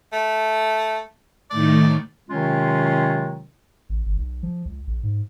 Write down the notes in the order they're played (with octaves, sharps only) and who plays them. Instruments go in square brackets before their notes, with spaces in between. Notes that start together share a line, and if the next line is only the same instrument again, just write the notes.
[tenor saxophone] A3
[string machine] A2 D#3 A3 [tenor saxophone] D5
[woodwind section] C3 D#3 F#3 G#3 C#4 F4
[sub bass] A1
G1
B1
F3
C#2
A#1
G#2